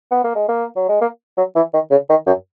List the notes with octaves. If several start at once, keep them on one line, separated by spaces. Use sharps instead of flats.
B3
A#3
G#3
A#3
F#3
G#3
A#3
F#3
E3
D#3
C#3
D#3
F#2